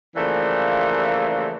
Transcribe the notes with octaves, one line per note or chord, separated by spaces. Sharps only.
C#3 E3 F3 G3 A3 A#3